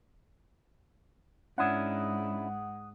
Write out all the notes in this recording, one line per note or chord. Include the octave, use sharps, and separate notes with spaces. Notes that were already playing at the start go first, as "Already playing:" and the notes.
G#2 C#4 D4 E4 F#5 D#6